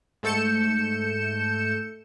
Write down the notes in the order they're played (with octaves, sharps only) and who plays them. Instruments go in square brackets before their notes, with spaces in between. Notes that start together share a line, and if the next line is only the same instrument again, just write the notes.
[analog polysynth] G#2 A3 A4 G6 C#7 E7